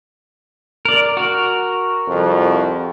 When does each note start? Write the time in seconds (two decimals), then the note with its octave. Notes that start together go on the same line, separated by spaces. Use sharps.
0.85 A#4 D5
1.17 F#4 A#4
2.08 C2 F2